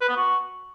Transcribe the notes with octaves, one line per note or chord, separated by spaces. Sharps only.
B4
B3
F#4